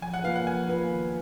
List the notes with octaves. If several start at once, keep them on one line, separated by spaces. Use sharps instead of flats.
F3 G#5
F#5
A#3 F4 B4 F5
F#5
F3 G#5
A#3 F4 B4
D#3